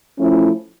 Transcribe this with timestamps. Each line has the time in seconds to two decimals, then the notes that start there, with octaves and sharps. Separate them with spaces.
0.18 F3 A3 C#4 E4